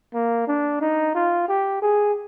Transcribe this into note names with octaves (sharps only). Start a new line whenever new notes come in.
A#3
D4
D#4
F4
G4
G#4